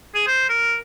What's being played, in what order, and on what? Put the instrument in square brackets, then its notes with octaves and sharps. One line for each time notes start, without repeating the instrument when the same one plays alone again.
[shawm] G#4
C5
A#4